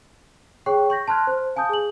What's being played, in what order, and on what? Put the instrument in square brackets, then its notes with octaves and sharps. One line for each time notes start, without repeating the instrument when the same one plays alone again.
[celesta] G#4 C#5 G5 C#6
C#6 G6 A#6 B6
A5 C6 F6 F#6 G#6
C5
F5 G#5 A5 D#6 G6
G#4 F#7